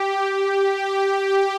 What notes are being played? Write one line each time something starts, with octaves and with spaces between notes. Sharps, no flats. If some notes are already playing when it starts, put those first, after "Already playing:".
Already playing: G4
G4
G4
G4